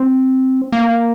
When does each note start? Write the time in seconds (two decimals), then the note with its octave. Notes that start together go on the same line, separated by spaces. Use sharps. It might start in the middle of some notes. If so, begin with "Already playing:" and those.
Already playing: C4
0.72 A#3